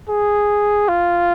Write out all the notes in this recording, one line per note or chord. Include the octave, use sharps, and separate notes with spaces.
G#4
F4